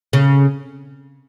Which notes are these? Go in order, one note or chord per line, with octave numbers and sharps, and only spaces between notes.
C#3